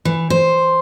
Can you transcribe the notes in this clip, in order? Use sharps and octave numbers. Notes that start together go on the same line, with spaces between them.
E3
C5